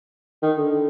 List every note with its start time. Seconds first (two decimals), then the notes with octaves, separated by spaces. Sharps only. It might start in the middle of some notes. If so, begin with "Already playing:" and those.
0.42 D#3
0.57 D3